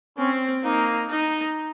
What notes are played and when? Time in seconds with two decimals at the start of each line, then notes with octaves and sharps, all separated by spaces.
0.18 C4 C#4
0.64 A#3 D#4
1.11 D#4